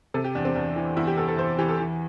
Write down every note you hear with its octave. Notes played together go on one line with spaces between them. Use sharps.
C3 A4
G4
E2 D4
C4
E2 D4
E3
E2 E4
G4
E2 A4
A4
E2 C5
E3 G4
A4
E3